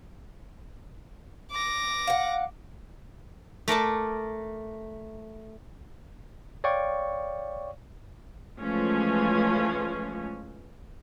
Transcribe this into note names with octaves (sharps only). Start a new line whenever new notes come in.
D6 A#6
F5 F#5
A3 A#4 D5 A5
C#5 D5 F5 G5 C#6
E3 F3 G#3 A3 C#4 F4